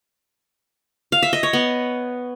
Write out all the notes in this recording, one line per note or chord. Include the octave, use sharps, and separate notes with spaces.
F5
E5
D#5
C#5
B3